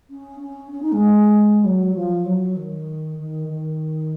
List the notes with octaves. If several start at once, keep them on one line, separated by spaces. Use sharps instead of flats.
C#4
C#4
C#4
D#4
G#3
F#3
F3
F#3
D#3
D#3
D#3